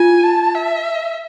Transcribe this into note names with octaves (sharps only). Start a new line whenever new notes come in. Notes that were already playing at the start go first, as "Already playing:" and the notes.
Already playing: F4 G#5
A5
E5